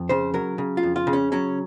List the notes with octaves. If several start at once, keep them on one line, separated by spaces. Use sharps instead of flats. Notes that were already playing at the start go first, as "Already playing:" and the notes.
Already playing: F2
C#3 C5
F#3 A#4
C#3
F4
F2
F4
C#3
C#4
F#3 C#4